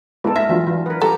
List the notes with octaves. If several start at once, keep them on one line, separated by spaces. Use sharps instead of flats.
G#3 A3 B3 E4 A4 B4
E5 F6 A#6 B6
E3 F#3 D4 F4
E3
A#4 B4
G3 G4 A4 A#5